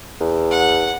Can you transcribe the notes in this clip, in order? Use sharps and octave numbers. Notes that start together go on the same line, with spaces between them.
E2
F#5